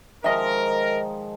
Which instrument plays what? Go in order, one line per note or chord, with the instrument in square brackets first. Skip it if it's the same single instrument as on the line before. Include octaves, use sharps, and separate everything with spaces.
[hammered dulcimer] D#3 F3 G#3 [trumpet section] A#4 [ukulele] D#5 E5